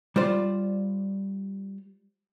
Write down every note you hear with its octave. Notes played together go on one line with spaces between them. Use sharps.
G3 F4 C5 D5